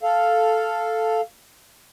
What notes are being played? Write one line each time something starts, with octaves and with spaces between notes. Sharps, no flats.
A4 F5